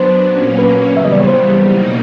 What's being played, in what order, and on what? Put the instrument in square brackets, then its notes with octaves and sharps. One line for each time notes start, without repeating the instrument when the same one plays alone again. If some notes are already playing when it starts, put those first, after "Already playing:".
Already playing: [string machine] F#3 B3 D4 [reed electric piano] C5
[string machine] A#2 F#3 A#3 C#4
[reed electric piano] B4
[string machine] C#3 E3 G3 B3 [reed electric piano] E5
[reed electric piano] D#5
D5
C#5
C5
[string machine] B2 F#3 A#3 D#4